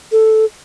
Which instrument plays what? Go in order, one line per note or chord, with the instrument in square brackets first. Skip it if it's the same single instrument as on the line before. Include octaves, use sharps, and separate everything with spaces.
[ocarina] A4